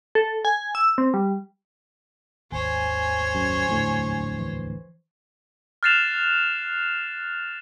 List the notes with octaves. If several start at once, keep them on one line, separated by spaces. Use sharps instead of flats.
A4
G#5
E6
C4
G3
G#1 D#2 C5 C#5 G#5
F#2
D1 A#1 E2 A2 D3 F#3
E3
F6 F#6 A6 C7 E7 F7